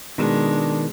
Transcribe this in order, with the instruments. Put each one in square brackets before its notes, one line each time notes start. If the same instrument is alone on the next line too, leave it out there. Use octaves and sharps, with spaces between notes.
[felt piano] B2 [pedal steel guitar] D#3 [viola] G#3 [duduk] D4